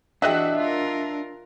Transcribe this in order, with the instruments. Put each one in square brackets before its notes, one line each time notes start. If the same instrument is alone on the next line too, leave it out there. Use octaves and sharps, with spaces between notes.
[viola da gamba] E3 F#4 [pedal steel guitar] D4 [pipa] G4 D#5 F#5 [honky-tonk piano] E5 F#6
[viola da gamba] F4 A#4